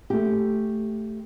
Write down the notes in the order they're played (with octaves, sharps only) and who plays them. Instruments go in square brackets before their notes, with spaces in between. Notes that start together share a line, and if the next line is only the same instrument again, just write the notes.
[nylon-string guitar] A3 G4